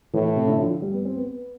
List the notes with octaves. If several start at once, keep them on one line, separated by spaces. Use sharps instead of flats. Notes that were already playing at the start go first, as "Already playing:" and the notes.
A2 E3
C3
D3
F3
G3
B3
C4
B3